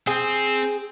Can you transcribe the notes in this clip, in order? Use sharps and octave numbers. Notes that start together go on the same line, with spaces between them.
C4 G#4